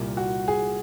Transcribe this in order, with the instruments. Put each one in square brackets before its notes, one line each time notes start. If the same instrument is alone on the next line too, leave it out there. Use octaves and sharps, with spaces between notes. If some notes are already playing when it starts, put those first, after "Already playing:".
Already playing: [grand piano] C2 A#2 G3
[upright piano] F#4
G#4